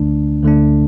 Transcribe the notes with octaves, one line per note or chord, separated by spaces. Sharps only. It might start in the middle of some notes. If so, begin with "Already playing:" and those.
Already playing: D2 D3 A3 D4
D2 D3 A3 D4